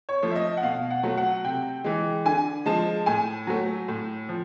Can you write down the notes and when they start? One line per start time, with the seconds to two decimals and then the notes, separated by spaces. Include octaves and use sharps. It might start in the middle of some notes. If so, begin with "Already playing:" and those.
0.09 C#5
0.23 F3 A3
0.31 E5
0.36 D#5
0.57 F#5
0.63 B2 F5
0.90 F#5
1.03 F#3 A3
1.18 F#5
1.44 C3 G5
1.84 E3 G#3
2.25 D3 G#5
2.66 F3 G#3 A5
3.06 A2 G#5
3.47 F#3 A3
3.88 A2
4.29 F3